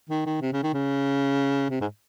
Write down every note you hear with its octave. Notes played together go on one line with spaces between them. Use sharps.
D#3
D#3
C3
C#3
D#3
C#3
C3
G#2